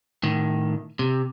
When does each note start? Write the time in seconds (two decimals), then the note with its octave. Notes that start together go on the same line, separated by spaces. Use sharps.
0.23 A2 D#3
0.99 C3